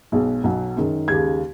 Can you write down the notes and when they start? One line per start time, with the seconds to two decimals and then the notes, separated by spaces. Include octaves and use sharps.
0.12 B1 B2 G#3
0.43 B1 B2 F#3
0.76 F#2 D#3 G#3
1.07 D#2 C#3 G#3 G#6